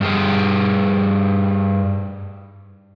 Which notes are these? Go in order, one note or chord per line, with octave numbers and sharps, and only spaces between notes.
G2 G4 G#4